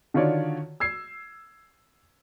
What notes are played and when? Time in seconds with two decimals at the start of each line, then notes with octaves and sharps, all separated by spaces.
0.14 D3 D#3 F4 F#4 C#5 D5
0.80 E6 G#6 C7